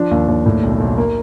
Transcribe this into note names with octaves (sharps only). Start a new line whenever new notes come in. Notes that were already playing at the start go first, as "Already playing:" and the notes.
Already playing: F3 D4
D#2
D#2
A2
B1
B1
A#3